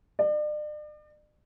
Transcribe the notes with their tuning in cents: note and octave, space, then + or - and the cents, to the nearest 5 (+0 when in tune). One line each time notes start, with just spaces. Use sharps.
D5 +40